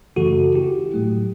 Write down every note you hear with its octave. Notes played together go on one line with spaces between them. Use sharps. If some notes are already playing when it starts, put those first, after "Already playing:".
F#2 C#3 E3 A3 F#4 A4
E4 G4
A2 F#3 A3